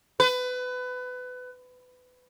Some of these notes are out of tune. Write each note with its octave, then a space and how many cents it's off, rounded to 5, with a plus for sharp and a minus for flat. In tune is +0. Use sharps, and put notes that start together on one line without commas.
B4 +25